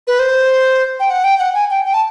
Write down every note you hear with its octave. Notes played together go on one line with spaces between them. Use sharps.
B4
C5
G5
F#5
G5
F#5
G#5
G5
G5
A5